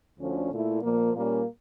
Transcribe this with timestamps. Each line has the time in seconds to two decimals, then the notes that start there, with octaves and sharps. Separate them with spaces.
0.20 D2 D3 F3 C#4
0.51 A#2 A3 E4
0.82 A#2 F3 A#3
1.14 A#2 G3 A#3 C#4